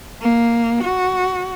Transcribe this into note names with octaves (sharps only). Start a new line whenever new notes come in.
A#3
F#4